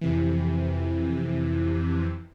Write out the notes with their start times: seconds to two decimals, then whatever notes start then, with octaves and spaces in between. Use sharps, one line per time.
0.01 F2 C3 E3